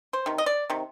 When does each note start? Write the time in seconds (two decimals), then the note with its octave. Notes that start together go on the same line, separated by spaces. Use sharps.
0.13 C5
0.26 C3 D#3
0.38 D#5
0.46 D5
0.70 C3 D#3